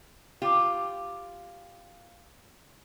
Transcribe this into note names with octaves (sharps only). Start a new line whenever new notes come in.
F4 G4